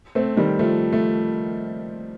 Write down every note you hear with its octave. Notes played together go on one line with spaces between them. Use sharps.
A3 C4
D#3 G3
F3 A3
F3 A3